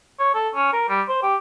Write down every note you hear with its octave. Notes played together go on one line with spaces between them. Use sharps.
C#5
A4
C#4
A#4
G3
C5
G4